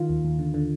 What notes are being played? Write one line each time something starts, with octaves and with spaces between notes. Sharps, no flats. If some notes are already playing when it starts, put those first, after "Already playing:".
Already playing: D#3 F4
D#2
D#2
D3
D3